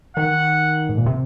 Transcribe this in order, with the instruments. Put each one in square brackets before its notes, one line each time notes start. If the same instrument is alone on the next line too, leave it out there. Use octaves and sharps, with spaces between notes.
[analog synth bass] D#3 [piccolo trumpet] F#5
[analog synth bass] G#2
A#2
C3